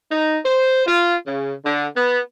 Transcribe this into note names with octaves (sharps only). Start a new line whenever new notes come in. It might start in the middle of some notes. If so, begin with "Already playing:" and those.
D#4
C5
F4
C#3
D3
B3